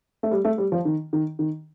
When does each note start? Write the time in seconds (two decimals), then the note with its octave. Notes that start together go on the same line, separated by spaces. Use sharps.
0.23 A3
0.31 G3
0.45 A3
0.58 G3
0.72 F3
0.85 D#3
1.13 D#3
1.39 D#3